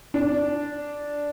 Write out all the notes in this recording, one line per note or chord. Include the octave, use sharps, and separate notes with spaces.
D4